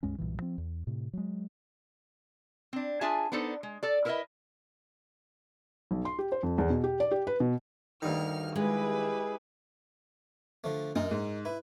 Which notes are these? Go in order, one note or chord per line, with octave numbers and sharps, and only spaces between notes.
C#2 G2 G#3 C#4
B1 G2 A#2 E3
F3 C4
E2
A2 C3
F#3 G#3
C4 D4
D4 F4 G#4 E5 G#5 A5
B3 D4 D#4 A4 C5
G#3
A4 D5
E4 A#4 B4 C#5 D#5 E5
B1
C6
G4
C5
F2
E2
B2
G4
D5
G4
B4
B2
D2 G2 D#3 F6
G#3 E4 G4 G#4 B4
D3 F3 A3
F#2 D#4 A#4
G#2
E4 B4